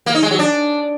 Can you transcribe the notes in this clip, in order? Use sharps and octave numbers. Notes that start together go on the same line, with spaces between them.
A#3
D#4
G#3
F#3
D4